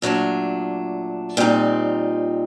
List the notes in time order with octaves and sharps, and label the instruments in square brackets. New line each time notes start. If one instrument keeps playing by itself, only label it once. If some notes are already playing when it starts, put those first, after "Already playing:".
[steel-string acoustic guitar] A#2 F#3 A3 D4
A#2 G3 C4 D#4